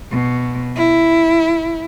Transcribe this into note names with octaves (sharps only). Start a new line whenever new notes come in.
B2
E4